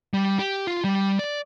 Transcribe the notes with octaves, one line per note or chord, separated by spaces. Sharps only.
G3
G4
F4
G3
D5